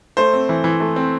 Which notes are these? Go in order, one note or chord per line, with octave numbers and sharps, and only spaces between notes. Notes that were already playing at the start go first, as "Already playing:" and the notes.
A3 C5
C4
E3
E3
A3
C4